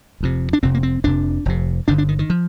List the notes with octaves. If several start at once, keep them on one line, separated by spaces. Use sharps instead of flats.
F1 F2 C3
D4
F1 F2 C3 C4
A#3
C4
F1 F2 C3 D4
F1 F2 C3
G1 G2 D3 D4
D4
D#3
D#3
F3